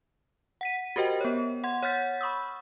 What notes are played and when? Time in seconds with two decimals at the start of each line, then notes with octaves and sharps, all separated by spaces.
0.61 F#5 B6 D#7
0.96 F#4 G4 A#4 C5 D#5 G5
1.21 B3 C#5
1.64 F#5 C6 G#6
1.83 C#5 F#5 F6 G6 A6 B6
2.21 B5 C#6 D#6 E6